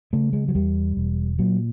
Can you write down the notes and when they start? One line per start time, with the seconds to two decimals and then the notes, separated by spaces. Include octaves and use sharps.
0.13 C#3 A3
0.33 G#3
0.48 F#3
0.55 E2 G3
0.97 E1
1.39 A#2 F#3